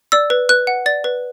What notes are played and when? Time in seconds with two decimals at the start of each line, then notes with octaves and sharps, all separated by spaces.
0.12 D5 E6
0.30 B4
0.49 B4 F#6
0.67 F#5
0.86 D5 A6
1.04 B4